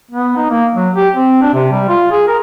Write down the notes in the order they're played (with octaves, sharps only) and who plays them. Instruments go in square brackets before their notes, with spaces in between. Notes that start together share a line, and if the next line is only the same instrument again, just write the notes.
[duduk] B3
D#4
A#3
F#3
G4
C4
D4
C3
G3
F4
G#4
A#4